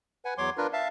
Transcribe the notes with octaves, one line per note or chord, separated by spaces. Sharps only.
B4 F#5 G#5
E2 F#3 C#5 C6 D6
D4 F4 A#4 B4
E5 F5 A5